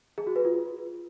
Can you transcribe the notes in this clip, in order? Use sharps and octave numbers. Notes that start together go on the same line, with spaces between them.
G#4
F#4
B4
F4